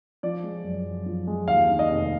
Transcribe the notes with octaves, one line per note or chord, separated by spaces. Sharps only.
F3 D5
G#3
F#2
F#2
F3
G#3
D#2 F5
D#3
D#5
F1